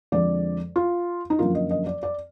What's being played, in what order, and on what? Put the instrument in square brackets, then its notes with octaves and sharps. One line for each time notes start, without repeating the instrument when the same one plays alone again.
[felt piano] F2 D3 F3 G#3 D5
F4
D#4
F#2 D3 F3 A#3 F4
D#5
D#5
D5
D5